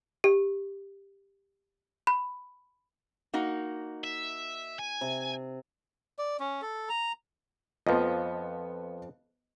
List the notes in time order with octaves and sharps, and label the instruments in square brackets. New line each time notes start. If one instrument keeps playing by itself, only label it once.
[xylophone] G4
B5
[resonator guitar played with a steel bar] A#3 D#4 F#4
[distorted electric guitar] E5
G#5
[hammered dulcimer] C3
[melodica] D5
C#4
A4
A#5
[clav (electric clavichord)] F2 F3 [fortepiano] B3 D#5